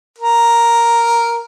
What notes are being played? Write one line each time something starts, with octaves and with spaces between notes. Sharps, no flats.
A#4